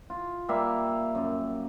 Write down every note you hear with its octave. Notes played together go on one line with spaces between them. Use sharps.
F4
G3 A#3 E5 F5
F#2